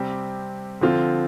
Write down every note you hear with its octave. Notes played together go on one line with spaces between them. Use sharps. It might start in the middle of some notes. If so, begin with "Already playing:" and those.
Already playing: C3 G3 C4 G4
D3 F3 C4 F4